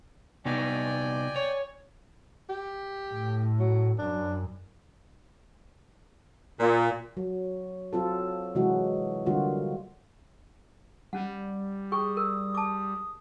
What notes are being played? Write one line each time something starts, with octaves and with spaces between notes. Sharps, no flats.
C3 B3 D#4 D5 G5 G#5
C#5
G4
A2
F#3
F#2 D4
A#2
F#3
F#3 C4 F4 A4
C3 E3 F#3 G#3 E4 F#4
D3 G3 A#3 F4 F#4
G3 C#4 F#5
G#4 G5 C#6 D#6
A#4
A5 D6